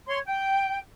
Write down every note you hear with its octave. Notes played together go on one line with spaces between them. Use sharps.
C#5 C6
G5